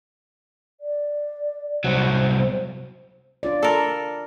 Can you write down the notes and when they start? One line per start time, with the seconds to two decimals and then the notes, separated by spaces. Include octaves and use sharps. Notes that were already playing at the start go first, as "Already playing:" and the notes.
0.81 D5
1.84 C2 F#3 C5
3.43 D4 F4 D5
3.63 A4 A#4